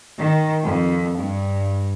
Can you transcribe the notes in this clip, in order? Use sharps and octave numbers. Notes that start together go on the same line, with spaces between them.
D#3
F2
G2